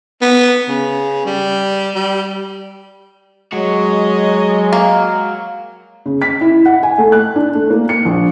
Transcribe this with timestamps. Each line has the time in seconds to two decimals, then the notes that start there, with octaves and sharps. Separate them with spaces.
0.22 B3
0.69 C#3
1.26 G3
1.95 G3
3.53 F#3 G#3 F#4 C#5 D#5
4.73 A#3
6.06 C#3
6.22 B6
6.41 E4
6.66 F#5
6.83 G#5
6.98 A3
7.12 F#6
7.36 D4
7.55 A3
7.70 A#3
7.89 C#7
8.05 A#1